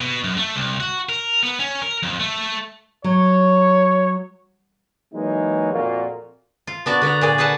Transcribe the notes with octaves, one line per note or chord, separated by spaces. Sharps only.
B2
F#2
A3
C2
F#4
A#4
B3
C#4
A#4
F2
A3
F#3 C#5
E3 F#3 G#3 A#3 D#4
F2 A#2 A#3 F4 F#4
F4
B3 D4 F#4 D5
D3 B3 D5 A#5
A#2 G#4 D5
G#4 B4 F#5 A5